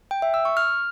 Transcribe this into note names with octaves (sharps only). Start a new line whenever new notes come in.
G5
E5
E6
C#6
F6